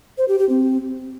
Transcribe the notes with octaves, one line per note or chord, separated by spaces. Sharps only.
C5
G4
G4
C4